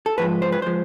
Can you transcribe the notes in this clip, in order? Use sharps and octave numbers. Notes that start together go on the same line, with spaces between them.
A4
G#2 F3 G#3 B4
C5
B4
F3 G#3 C5